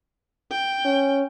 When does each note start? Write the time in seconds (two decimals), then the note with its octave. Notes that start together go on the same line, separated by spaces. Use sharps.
0.51 G5
0.85 C#4